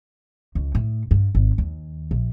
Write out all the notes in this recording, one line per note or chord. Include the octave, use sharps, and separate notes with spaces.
C#2
A2
G2
G#1
D#2
A#1